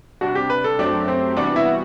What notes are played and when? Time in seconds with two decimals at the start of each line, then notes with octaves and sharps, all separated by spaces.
0.21 C3 G3 D4 F#4
0.35 G4
0.50 B4
0.64 A4
0.79 F#2 F#3 A3 C4 D4 G4
1.08 C4
1.37 C3 E3 G3 B3 D4 F#4
1.56 E4